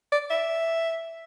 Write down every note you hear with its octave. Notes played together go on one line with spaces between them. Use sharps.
D5
E5